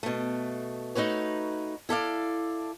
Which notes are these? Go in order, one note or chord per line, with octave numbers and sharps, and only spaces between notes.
B2 A3
A3 D#4 F#4 B4 C#5
E4 A4 D5 F5